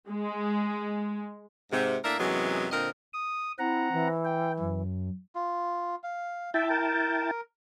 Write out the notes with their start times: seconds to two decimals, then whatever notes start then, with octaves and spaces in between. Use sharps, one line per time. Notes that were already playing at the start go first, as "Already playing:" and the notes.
0.10 G#3
1.72 G#2 C3
2.04 A2 A#3 D4 A#4 E5
2.19 F#2 C3 E3 F#3 G#3 B3
2.71 A#2 D3 C4 A#4 C5 D#5
3.13 D#6
3.59 C4 E4 F#5 A#5
3.92 E3
4.25 G5
4.59 F#2
5.35 F4
6.04 F5
6.54 E4 E5 G5 A5
6.70 A#4